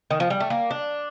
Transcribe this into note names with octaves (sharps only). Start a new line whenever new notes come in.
D#3
F3
G3
A3
A#3
D4